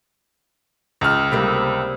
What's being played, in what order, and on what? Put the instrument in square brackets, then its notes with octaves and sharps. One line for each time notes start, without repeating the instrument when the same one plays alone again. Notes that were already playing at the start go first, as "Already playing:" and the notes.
[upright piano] C#2 F6
[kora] C3 G3 A#3